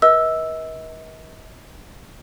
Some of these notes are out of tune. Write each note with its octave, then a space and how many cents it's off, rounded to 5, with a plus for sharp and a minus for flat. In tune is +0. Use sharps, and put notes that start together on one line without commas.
B4 -45 D#5 +40 E6 +0